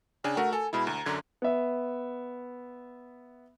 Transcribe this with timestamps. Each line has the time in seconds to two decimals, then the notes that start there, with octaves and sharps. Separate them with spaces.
0.24 C#3 D4 G5 G#5
0.37 A3 F#4 A#4 F#5
0.53 A4 G#5
0.73 B2 G#3 E4 B5
0.87 D2 A#5
1.06 F#2 D3 G#6
1.42 B3 E5